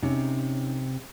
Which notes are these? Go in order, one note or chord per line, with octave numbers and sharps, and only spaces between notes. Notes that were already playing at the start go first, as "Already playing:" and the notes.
C3 C#4 D#4